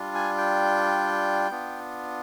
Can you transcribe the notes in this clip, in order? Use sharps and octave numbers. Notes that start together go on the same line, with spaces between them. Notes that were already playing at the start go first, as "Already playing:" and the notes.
Already playing: G3 D4 F4
G#5
G5
B3 D4 F4